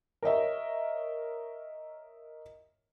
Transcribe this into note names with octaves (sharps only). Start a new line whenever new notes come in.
A#4 C#5 D#5 E5